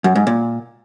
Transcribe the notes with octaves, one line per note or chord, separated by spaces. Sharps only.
F#2
G#2
A#2